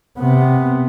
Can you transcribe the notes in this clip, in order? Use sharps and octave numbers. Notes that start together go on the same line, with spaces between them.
C3 B3